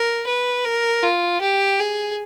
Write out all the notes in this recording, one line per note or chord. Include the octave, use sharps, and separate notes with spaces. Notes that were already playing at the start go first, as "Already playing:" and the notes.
Already playing: A#4
B4
A#4
F4
G4
G#4